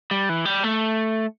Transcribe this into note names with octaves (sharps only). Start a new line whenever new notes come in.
G3
E3
G3
A3